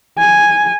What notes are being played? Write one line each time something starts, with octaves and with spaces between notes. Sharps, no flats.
G#5